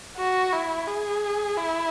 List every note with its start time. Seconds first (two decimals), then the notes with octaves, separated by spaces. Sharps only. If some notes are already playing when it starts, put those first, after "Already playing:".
0.18 F#4
0.53 E4
0.87 G#4
1.58 E4